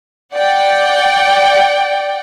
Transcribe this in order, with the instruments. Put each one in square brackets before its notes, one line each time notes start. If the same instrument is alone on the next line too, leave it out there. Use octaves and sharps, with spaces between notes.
[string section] D5 F#5 G5